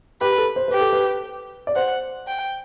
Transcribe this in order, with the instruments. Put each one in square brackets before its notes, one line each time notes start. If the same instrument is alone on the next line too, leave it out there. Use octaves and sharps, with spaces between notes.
[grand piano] G4 [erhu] B4
[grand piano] A4
C5
[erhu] G4 [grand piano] B4
[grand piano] A4
B4
D5
[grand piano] C5 [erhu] F#5
[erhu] G5